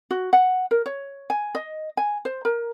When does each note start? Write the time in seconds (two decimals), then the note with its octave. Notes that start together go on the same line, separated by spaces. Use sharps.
0.11 F#4
0.33 F#5
0.71 A#4
0.86 C#5
1.30 G#5
1.55 D#5
1.97 G#5
2.25 C5
2.45 A#4